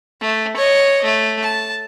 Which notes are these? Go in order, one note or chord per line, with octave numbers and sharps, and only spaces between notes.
A3
C#5 D#5
A3
A5